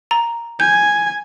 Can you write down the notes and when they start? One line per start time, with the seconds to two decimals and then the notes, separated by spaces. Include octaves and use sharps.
0.11 A#5
0.60 G#5 G6